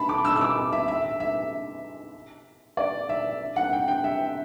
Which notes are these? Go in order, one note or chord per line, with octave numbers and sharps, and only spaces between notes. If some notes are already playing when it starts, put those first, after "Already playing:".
Already playing: A5 B5
D6
E6
E6
D6
E5
E5
E5
D5
E5
F#5
G5
G5
E5